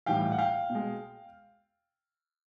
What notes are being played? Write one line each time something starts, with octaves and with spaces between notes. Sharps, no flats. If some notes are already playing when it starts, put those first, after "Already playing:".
A2 E3 G3 F5 G5
F#5
F5 G5
B2
G#3